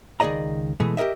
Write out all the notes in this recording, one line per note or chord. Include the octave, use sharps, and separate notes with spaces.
C#2 D#3 G#4 D5 D#5 A#5
B2 E3 G#3 A3
G4 G#4 A#4 D#5 E5